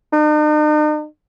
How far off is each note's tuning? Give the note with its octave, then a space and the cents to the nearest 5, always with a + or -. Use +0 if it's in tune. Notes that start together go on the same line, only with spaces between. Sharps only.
D#4 -45